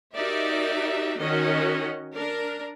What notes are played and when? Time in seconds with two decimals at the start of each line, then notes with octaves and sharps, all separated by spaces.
0.14 D#4 F#4 G4 A#4 D5 E5
1.17 D#3 C#4 F#4 D#5
2.15 D4 A#4